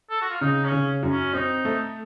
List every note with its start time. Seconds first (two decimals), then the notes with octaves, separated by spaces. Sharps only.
0.10 A4
0.22 F#4
0.31 F4
0.41 C#3 D#4
0.65 C#4
0.72 C#3
1.03 F#2
1.11 C#4
1.33 C4 D#4
1.65 A3